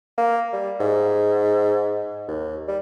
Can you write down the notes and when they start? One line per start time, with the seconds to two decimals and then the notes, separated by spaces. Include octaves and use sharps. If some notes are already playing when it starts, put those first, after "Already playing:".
0.18 A#3
0.53 G3
0.80 G#2
2.28 D#2
2.68 G3